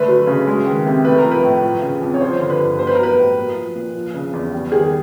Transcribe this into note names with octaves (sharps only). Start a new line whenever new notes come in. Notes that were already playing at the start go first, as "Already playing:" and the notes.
Already playing: D3 A3 B4
F#3
C#3
G#3
D#3
C3
A3 B4
A#4
F3
B4
A2
F3
C#3
F2
C#5
F3 C5
D3
B4
G2
B3 C5
B4
F#3 A#4
B4
A2
A#3
F3
A#2
F3
C#3
E2
G3
D#3 G#4